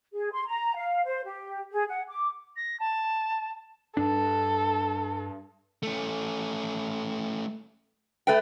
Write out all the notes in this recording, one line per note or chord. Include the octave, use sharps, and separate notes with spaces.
G#4
C6
A#5
F5
C5
G4
G#4
F#5
D6
A#6
A5
G2 D4 A4
A3 C#4
A3 B4 G5